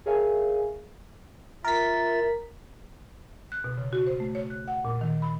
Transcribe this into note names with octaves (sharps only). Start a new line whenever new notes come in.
G#4 A#4 C#5 E5 F5 G#5
F4 A#4 E5 A6 B6
F#6
B2
C#3
F#4
C5
A3
C#5
F#6
F#5
A#2
D#3
B5